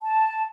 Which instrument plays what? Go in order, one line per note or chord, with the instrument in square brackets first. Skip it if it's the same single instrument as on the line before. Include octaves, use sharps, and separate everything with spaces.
[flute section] A5